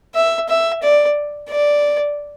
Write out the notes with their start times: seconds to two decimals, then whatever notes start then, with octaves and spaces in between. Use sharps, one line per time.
0.15 E5
0.49 E5
0.83 D5
1.50 D5